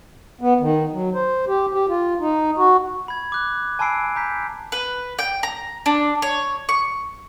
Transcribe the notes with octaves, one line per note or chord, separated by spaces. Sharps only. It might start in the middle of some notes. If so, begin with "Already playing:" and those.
B3
D#3
F#3
C5
G4
G4
F4
D#4
F#4
B5 G#6
D6 F#6
G#5 A5 B5 E6 C7 D7
A#5 G6 B6
B4
G5
A#5
D4
C#5
C#6